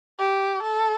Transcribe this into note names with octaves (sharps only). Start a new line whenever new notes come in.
G4
A4